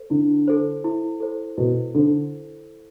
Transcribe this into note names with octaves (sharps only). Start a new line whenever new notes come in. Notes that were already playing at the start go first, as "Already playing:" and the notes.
Already playing: A4 C5
D3 E4
A4 C5
E4
A4 C5
B2 E4
D3 A4 C5